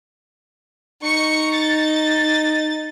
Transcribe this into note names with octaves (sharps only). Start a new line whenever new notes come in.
D#4 C#6 C#7
A6